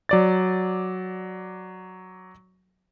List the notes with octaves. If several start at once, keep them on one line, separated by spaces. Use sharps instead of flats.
F#3 D5 A6